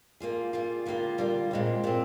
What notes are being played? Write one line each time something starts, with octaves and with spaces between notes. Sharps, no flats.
G3 A#3 F4 G#4
G3 A#3 F4 G#4
D3 G3 A#3 F4
D3 G3 A#3 F4
A#2 G#3 C4
A#2 G#3 C4